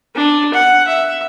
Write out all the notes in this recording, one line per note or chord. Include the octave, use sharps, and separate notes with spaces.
D4
F#5
E5